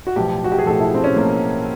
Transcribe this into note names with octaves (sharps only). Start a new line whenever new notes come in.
F#4
B1 A2 F3 G4
F#4
G4
G#4
B1 A2 F3 A4
E4
C4
C#4
B1 A2 F3 A#3